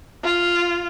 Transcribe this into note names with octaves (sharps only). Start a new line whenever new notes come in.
F4